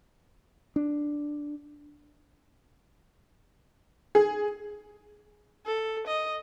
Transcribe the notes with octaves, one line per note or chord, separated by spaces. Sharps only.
D4
G#4
A4
D#5